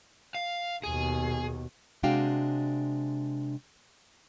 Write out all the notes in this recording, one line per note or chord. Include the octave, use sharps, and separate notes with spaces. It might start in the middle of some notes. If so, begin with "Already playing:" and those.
F5
D#2 B2 G#4
C3 G#3 D4 F#4 F5 G5